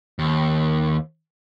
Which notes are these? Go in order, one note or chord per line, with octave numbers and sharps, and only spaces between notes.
D#2